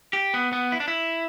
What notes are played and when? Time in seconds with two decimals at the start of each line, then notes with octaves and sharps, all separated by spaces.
0.13 G4
0.34 B3
0.53 B3
0.72 E4
0.80 D4
0.88 E4